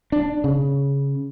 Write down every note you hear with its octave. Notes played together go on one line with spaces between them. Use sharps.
D4
C#3